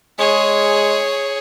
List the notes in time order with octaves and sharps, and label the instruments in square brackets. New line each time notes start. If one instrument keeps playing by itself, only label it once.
[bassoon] G#3 [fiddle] G#4 C#5